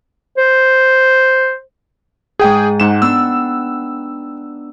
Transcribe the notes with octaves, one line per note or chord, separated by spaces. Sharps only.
C5
G#2 G#4 G5 D#6 G6
G#2 F#5 G5 E7
B3 D4 E6